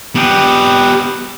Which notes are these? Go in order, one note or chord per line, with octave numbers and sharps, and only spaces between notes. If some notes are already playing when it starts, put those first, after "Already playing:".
B3 G4